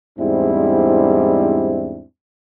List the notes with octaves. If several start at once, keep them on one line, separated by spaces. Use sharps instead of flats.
E2 G#2 G3 C4 D4 E4